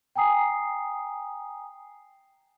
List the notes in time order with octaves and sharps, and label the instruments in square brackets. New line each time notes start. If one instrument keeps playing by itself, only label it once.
[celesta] G5 G#5 A#5 D#6 C7